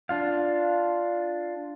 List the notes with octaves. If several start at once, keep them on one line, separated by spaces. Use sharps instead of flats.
D4 F4 F5